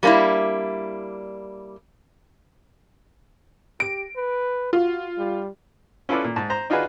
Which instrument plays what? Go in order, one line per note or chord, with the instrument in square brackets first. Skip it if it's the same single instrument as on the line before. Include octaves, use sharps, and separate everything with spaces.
[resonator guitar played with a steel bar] G3 A#3 C#4 D4 E4
[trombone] G4 [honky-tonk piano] D7
[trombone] B4
[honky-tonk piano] F4 [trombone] F#4
[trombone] G3
[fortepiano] C#4 E4 F4 A4 B4 D5
A#2
G#2 A5
C5 A#5
D4 D#4 F4 F#4 G#4 B4